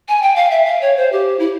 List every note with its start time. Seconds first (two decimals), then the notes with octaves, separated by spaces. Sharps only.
0.08 G#5
0.22 G5
0.36 F5
0.51 E5
0.65 F5
0.81 C#5
0.97 C5
1.12 G4
1.39 E4